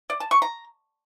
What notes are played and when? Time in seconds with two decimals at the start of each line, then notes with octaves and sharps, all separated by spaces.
0.10 D5
0.20 A5
0.31 C#6
0.42 A#5